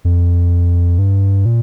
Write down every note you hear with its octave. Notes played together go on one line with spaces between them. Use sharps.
F2
G2
A#2